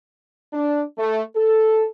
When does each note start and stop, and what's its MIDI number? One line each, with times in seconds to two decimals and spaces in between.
0.53 0.81 62
0.98 1.21 57
1.36 1.85 69